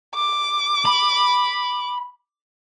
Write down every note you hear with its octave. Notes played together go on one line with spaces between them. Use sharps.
D6
B5